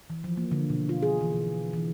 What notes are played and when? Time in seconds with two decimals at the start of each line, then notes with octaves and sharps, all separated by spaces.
0.10 E3
0.24 F3
0.37 A#3
0.51 D3
0.70 B2
0.89 F4
1.02 G#4
1.21 E3
1.33 B2
1.73 E3